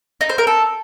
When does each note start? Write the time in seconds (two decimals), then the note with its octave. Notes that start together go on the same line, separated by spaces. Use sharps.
0.21 D#4
0.29 C5
0.38 A#4
0.47 A4